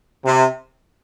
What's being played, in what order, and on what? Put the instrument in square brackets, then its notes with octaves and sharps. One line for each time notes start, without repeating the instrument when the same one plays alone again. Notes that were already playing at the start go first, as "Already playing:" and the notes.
[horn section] C3